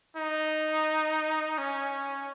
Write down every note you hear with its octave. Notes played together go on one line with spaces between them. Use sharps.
D#4
C#4